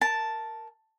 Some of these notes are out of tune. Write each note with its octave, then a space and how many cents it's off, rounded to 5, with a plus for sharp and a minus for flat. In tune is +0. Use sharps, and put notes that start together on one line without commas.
A#4 +0 A5 +0